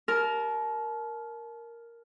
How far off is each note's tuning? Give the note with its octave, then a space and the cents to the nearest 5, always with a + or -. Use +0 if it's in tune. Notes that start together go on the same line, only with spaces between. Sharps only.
A#4 +0 A5 -35